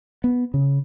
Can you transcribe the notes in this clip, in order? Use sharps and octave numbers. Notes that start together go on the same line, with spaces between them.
B3
C#3